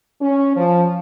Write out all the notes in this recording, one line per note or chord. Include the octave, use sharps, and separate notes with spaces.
C#4
F3